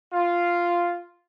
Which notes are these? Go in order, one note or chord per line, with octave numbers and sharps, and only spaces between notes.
F4